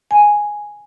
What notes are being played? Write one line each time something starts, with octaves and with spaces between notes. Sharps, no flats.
G#5